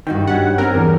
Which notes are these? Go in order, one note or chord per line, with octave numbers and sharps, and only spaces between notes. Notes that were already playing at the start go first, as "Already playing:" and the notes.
G2 D#3 D#4 F#4 G5
G3 C#4 F#5
C4 C#4 A#4
E2